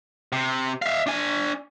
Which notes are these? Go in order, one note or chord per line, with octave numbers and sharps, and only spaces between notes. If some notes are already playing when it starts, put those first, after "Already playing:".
C3
E5 F5
D4 G#5